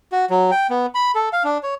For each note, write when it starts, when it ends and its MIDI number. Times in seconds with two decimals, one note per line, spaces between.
0.12 0.25 66
0.30 0.51 54
0.51 0.67 79
0.70 0.86 59
0.95 1.12 83
1.15 1.29 69
1.33 1.43 77
1.44 1.58 62
1.63 1.75 73